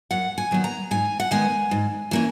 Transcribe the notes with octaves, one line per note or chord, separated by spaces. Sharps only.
F#2 F#5
G#5
D#3 F#3 B3
A#5
G#2 G#5
F#5
D#3 G#3 B3 G#5
G#2
E3 A#3 C#4